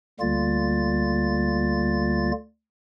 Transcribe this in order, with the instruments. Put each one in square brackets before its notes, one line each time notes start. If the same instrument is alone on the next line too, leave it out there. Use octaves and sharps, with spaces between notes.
[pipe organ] D2 D3 G3 A#3 F4 A6